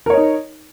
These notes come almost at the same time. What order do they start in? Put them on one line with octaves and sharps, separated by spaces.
A#4 C#5 D#5 D#4